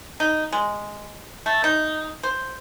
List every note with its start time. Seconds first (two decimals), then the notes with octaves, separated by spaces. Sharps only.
0.20 D#4
0.52 G#3
1.46 A3
1.64 D#4
2.23 C5